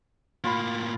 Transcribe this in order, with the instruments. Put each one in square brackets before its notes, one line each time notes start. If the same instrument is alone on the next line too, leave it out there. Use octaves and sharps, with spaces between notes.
[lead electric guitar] A2 A#3 [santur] F4 B5